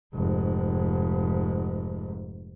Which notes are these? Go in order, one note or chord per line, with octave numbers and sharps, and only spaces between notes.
F1 G#2